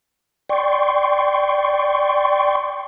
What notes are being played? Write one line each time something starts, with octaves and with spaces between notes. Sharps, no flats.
D5 G5 C6 C#6